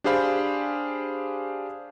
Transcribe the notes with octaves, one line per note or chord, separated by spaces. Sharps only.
D4 G4 G#4 C5 F5 B5